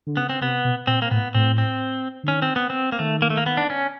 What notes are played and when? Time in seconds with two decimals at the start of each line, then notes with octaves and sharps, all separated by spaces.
0.07 D3
0.17 C#3 B3
0.29 C4
0.41 C3 B3
0.65 B2
0.87 A#2 C4
1.02 A#3
1.11 A2 B3
1.35 A2 C4
1.58 C4
2.23 D3
2.28 D#3 C#4
2.42 C4
2.56 B3
2.70 C4
2.92 A#3
2.99 D#3 A3
3.22 A#3
3.30 A3
3.37 A#3
3.46 B3
3.57 D4
3.70 C#4